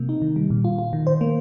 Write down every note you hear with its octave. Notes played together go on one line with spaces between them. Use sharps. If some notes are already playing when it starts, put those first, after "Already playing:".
Already playing: C3 A#3
D#4
D#3
G3
A#2
F4
F4
D#3
C5
A#3